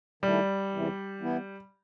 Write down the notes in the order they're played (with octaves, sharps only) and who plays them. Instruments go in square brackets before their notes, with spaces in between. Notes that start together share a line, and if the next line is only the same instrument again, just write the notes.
[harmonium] D#3 A3 E4 [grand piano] G3
[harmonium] E2 C3 E3
E3 B3 E4